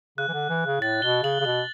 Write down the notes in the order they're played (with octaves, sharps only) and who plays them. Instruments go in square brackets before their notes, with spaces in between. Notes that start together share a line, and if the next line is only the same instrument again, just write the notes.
[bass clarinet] C#3 [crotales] F#6
[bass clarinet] E3
D3
E3
C#3
[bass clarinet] A2 [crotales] A6
[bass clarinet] B2 [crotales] G7
[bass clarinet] C#3 [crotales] F#7
[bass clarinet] C#3
[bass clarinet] B2 [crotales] F#7